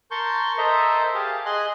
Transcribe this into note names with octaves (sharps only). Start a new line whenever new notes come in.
A#4 A5 C6 C#6 G6
A4 A#4 C5 D#5 E5 A#5
G4 G#4 F5 A5
G#4 D#5 C6 F#6